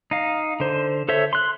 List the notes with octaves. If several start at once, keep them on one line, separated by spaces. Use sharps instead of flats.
D#4 F5
D3 C5
A4 C5 C#5 E5
C6 F#6